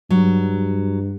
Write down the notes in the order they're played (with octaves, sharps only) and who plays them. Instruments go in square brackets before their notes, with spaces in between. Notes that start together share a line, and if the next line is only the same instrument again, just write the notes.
[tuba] G2 [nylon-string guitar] F#3